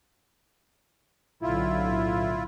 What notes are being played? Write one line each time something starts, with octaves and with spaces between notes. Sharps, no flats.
B1 A2 D3 E4 F4